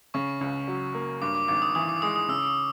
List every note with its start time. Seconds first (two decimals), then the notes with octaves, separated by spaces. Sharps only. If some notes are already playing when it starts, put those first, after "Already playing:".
0.14 C#3 C#6
0.41 C#2
0.68 F#3
0.95 A#3
1.22 G2 D6
1.35 D6
1.48 G#1 D6
1.62 D#6
1.75 E3 D#6
1.89 D6
2.02 G#3 D#6
2.16 D#6
2.29 C#3 E6